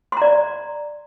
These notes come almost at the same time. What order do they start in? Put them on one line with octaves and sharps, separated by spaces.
C6 A#5 D5